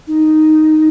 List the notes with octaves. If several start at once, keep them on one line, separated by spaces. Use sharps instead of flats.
D#4